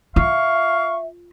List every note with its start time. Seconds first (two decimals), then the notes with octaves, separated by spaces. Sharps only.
0.16 F4 E5 F5 C#6